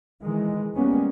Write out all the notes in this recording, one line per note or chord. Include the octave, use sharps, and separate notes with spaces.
D#3 E3 G#3
G3 G#3 A#3 B3 C#4